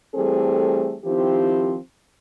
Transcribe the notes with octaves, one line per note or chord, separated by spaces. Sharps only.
E3 G3 A3 C4 G#4 A4
D#3 F3 C4 E4 G4